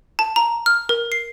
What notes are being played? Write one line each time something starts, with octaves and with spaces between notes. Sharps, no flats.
A5
A#5
F6
A#4
C7